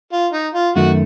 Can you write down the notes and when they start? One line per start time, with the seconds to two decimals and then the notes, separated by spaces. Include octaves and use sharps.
0.12 F4
0.33 D#4
0.54 F4
0.75 F#2 D#3 A3 F#4